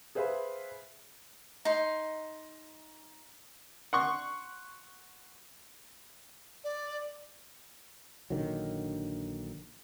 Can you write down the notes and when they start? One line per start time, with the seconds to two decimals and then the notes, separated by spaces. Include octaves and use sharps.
0.15 G#4 B4 C5 E5 F5 B5
1.65 D#4 C6
3.93 F#5 C6 C#6
6.64 D5
8.30 A#1 D3 D#3 F#3